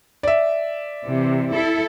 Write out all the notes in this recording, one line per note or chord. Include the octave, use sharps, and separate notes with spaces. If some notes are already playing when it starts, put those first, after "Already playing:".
D5 E5
C3 E3
E4 A4